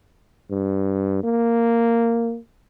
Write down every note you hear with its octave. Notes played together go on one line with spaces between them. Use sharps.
G2
A#3